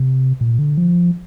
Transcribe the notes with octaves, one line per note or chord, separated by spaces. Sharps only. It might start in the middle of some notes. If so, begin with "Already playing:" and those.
Already playing: C3
A#2
D3
F3